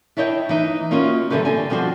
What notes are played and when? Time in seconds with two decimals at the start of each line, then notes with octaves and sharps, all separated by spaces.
0.17 D4 E4 C#5 D#5 E5 G5
0.49 E3 D#4
0.91 A#3 C#4 F4 F#4 C#5 D#5
1.30 D3 E3 F#3 A3 G4 B4
1.45 D3 C4 G#5
1.70 F3 G3 C4 D4 F#4 C5